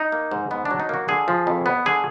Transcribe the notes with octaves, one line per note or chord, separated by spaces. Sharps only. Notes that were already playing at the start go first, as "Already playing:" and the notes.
Already playing: D#4
A#3
G#2
G#2 B3
D4
F#3
D#4
A#3 F#4
D3 G#4
F3
F2
B3
D3 G#4